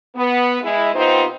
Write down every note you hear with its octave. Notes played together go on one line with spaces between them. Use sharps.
B3
G#3 E4
C3 B3 C4 D#4 F4 C5